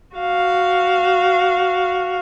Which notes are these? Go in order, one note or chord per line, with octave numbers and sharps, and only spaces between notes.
F#4 F5